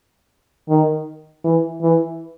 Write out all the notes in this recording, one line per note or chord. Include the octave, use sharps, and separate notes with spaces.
D#3
E3
E3